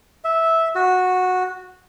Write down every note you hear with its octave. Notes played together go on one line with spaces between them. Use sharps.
E5
F#4